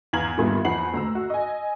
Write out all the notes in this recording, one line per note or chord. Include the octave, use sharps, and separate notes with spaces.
E2 F5 A#5 G#6 F#7
G2 A#2 D#3 B3 E4
E2 F3 F#5 B5 C7 F#7
D2 A#5 E6
F#4
D#5 G#5